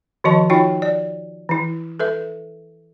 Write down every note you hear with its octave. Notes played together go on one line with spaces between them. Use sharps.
D#3 F3 F#4 D#5 A5
D#4 F4 F#4 C#5 G5
D5
E3 E4
A4 B4 E5